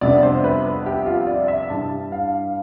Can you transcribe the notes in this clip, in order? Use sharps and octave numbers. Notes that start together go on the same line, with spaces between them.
F2 C3 G3 B3 D4 D5
C5
B4
B4
G4
F4
D5
E5
G2 E3 G3 A5
F5